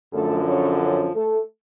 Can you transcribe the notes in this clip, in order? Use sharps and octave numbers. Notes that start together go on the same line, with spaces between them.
F#2 D3 F3 A3 A4
C#4 C#5
C#4 C#5
A3 A4